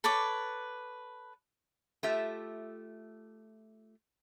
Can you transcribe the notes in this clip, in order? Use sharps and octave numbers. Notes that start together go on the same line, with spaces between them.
A4 B4 C#5 D6
A3 F4 G4 E5